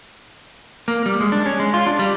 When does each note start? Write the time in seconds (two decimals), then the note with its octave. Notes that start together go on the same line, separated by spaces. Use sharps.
0.88 A#3
1.06 G3
1.20 G#3
1.32 D4
1.46 C#4
1.59 G#3
1.74 F4
1.87 D4
1.99 G3